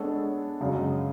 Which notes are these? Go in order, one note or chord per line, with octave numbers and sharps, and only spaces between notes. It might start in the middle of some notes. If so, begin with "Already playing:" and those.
Already playing: G#3 B3 D4 A4 C#5
F#2 C#3 G#3 C#4 F#4